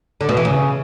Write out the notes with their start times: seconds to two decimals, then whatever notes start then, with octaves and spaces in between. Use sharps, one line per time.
0.21 D3
0.29 B2
0.37 E3
0.45 C#3